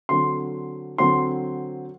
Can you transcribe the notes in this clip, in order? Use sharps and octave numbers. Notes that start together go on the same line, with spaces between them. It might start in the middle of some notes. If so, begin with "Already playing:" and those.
D3 F#3 C4 C6
D3 F#3 C4 C6